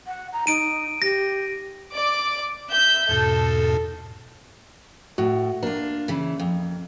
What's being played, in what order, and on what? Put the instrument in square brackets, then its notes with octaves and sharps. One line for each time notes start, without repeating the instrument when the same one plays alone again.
[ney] F#5
A#5
[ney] D#4 [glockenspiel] D7 D#7
[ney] G4 [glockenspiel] A#6
[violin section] D5 D6
E5 G6
[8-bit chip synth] E2 G#2 B2 [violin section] A4
[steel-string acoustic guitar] A2 [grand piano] F#4
[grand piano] A#3 [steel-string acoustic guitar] D4 F4
[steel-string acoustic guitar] C#3 E3
F2